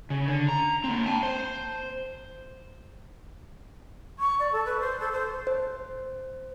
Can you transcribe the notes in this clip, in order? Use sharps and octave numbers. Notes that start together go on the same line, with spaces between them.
C#3
D3
A#5
A#3 C4
G5 A5
C5
C#6
D5
A4
B4
C5
A4
C5
C5